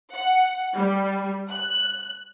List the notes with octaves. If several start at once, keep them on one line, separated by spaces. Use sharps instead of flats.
F#5
G3
F#6